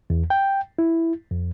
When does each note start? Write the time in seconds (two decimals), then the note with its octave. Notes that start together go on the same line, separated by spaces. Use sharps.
0.10 E2
0.30 G5
0.79 E4
1.31 F2